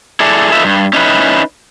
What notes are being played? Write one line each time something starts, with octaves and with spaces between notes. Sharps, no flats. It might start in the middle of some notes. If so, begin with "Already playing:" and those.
E4 G#4 A4 D5
D#4 F4 A4 B4 E5
G2
C#4 D#4 E4 B4